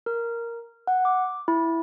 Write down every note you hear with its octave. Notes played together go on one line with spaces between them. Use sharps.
A#4
F#5
D6
E4